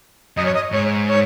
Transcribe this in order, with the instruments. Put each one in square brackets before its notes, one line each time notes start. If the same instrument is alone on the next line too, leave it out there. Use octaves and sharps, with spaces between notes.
[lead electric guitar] F#2 [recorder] D#5
[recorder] C#5
D#5
[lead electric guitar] G#2 [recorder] C#5
[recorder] C#5